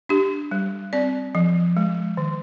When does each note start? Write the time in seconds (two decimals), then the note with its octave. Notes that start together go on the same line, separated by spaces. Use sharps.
0.09 D4 G4
0.51 G3
0.93 C4 D5
1.35 F3
1.77 G#3
2.17 D#3